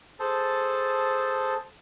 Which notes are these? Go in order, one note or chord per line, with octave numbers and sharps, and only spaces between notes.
G#4 A4 C5 A5